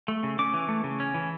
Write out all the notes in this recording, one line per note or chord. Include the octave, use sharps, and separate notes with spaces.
A3
C#3
C#4 D6
E3
A3
C#3
C#4
E3